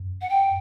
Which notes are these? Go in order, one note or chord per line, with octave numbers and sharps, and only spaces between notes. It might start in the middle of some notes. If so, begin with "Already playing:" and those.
Already playing: F#2
F#5
G5